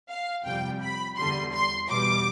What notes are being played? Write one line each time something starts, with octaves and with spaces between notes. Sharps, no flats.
F5
F2 C3 G3 G5
B5
E2 D3 G3 C6
C6
E2 B2 G3 D6